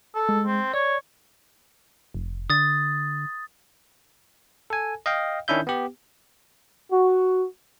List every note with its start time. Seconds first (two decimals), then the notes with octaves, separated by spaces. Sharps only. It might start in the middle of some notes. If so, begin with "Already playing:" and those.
0.14 A4
0.29 G#3
0.46 C4
0.74 C#5 D5
2.14 F1
2.50 D3 D#6 A6
4.70 A4 G#5
5.06 D#5 F5 G5
5.48 D#3 C#4 D4 E4 E5 G6
5.67 B3 G4
6.91 F#4